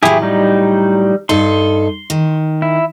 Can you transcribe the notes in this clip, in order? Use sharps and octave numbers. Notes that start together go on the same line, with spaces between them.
A2 F#3 E4 G4 G#4
G3 D#4
G2 D#4 A4 C6
D#3
E4